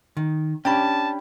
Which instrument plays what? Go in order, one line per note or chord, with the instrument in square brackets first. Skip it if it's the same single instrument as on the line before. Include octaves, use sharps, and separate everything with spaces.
[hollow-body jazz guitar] D#3
[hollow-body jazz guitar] C#4 D4 G4 [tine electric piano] G5 B5 [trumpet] A5